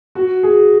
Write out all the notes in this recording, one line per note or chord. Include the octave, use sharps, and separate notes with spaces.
F#4
G#4